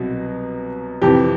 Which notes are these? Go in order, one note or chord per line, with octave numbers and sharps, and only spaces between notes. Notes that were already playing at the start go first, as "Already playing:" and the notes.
Already playing: C2 B2 F#3
F2 C3 E3 G4